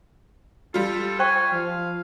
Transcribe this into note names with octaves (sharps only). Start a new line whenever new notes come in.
G3 F4 A4
C5 G5 G#5 C#6
F3 F5